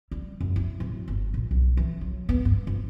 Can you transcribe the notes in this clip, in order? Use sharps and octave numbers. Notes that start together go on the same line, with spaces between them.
G3
F#2
E4
D1
G1
A#2
B1
E3
F#3
B3
G2
F2